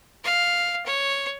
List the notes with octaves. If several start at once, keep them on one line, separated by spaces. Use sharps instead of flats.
F5
C#5